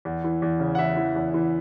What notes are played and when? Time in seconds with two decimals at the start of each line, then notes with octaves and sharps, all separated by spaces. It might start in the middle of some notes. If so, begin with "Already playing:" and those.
0.05 E2
0.24 E3
0.42 E2
0.60 C#3
0.75 F#5
0.79 E3 E5
0.97 E3
1.16 E2
1.34 E3